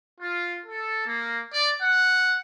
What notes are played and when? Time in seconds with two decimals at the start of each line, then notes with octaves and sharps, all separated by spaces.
0.21 F4
0.66 A4
1.07 A#3
1.53 D5
1.83 F#5